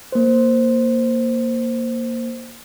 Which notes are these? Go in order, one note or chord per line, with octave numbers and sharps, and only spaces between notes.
A#3 C5